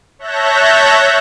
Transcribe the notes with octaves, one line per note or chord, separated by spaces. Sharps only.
C#5 E5 A5 F#6 G6 A#6